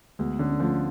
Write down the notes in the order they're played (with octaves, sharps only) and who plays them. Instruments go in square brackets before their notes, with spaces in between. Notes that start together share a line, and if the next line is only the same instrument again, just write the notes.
[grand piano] D2 [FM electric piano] G#3 B3
[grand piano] D3 [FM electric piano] A3 C#4
[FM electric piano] D4
[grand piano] F3 [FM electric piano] A3 C#4